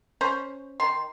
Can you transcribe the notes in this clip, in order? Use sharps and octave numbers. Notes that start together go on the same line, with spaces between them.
C#4 C5
D#3 C6